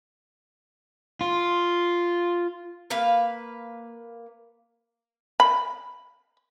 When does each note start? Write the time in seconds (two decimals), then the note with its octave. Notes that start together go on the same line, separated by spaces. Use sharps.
1.21 F4
2.90 A#3 B4 F5
5.40 B5